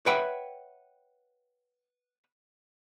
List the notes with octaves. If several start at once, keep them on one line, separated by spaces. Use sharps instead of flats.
B4 C#5 E5 F#5 G5 B5